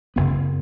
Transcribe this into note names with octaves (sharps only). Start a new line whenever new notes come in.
F#1 F#2 C#3 B3